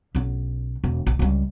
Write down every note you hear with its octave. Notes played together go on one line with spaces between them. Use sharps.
B1 C#4
E1
A#1
C#2 G3